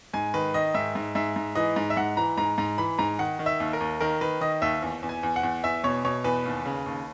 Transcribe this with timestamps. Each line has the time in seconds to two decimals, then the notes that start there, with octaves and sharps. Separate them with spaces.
0.14 G#2 G#5
0.34 D#3 B4
0.54 D#3 D#5
0.74 G#2 E5
0.95 G#2
1.15 G#2 E5
1.36 G#2
1.55 E3 D#5
1.76 G#2
1.90 E5
1.96 G#2 F#5
2.17 E3 A#5
2.38 G#2 A#5
2.58 G#2 A#5
2.78 E3 B5
2.98 G#2 A#5
3.19 D#3 F#5
3.39 D#3
3.46 E5
3.60 D#2
3.73 A#4
3.80 D#2
4.01 D#3 A#4
4.21 D#3 B4
4.41 D#3 D#5
4.61 D#2 E5
4.82 E2
5.03 E2
5.09 G#5
5.23 E2
5.36 F#5
5.43 E2
5.64 E2 E5
5.84 B2 C#5
6.04 B2 C#5
6.24 E2 B4
6.45 D#2
6.65 C#3
6.86 D#2